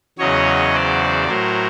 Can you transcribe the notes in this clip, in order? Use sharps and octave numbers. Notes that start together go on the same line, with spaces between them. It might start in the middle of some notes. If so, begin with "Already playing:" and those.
E2 C#3 F#3 C#5 D#5
C5 D5
A2 F#3 A#4 C5